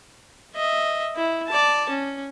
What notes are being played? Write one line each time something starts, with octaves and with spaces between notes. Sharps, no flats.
D#5 E5
E4
D5 A5
C#4